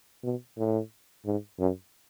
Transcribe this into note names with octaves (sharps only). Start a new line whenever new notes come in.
B2
A2
G#2
F#2